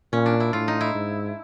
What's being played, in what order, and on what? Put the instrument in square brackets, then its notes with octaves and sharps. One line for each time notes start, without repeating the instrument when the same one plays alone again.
[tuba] A#2 [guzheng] C#4
[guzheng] D4
E4
[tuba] A2 [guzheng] F4
[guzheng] D#4
E4
[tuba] G#2